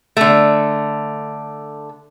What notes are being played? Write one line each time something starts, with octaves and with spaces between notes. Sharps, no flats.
D3 A3